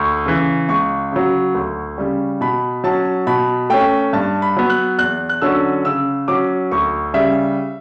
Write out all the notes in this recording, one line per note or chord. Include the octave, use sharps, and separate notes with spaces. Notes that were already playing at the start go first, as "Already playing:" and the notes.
Already playing: D2 C#6
C#3 E3
C#2 C#6
C#3 F#3
D2
C#3 G3
B2 B5
F#3 C#4 A5
B2 B5
A3 C#4 G5
G2 A5
B5
F#3 B3
F#6
E2 F#6
F#6
D3 F#3 C#4 E6
C#3 E6
F#3 C#4 D6
D2 C#6
C#3 G3 E5